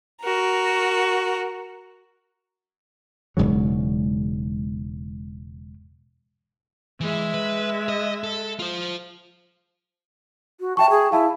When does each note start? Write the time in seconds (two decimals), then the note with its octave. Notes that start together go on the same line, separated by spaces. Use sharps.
0.23 F#4 A#4
3.37 E1 G#2 C#3 F#3
7.01 E3 G#3 E5
7.34 B4
7.89 D#5
8.24 A4
8.60 F4 C5
10.60 F#4
10.77 E5 G5 A5 C#6
10.90 G#4
11.12 E4 F5 A5